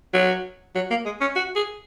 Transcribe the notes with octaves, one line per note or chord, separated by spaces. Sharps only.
F#3
F#3
A#3
G#3
C#4
F#4
G#4